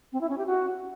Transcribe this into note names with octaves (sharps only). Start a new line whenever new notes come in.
C4
E4
C#4
G4
F#4